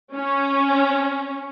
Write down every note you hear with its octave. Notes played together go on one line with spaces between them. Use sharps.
C#4